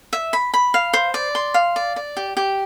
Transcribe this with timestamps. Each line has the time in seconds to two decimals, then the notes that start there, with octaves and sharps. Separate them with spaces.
0.13 E5
0.33 B5
0.54 B5
0.74 F5
0.93 C5
1.14 D5
1.35 C6
1.54 F5
1.76 D5
1.96 D5
2.17 G4
2.37 G4